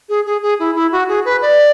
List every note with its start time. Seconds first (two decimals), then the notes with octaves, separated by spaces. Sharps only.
0.09 G#4
0.26 G#4
0.43 G#4
0.59 E4
0.75 E4
0.92 F#4
1.09 G#4
1.25 B4
1.42 D5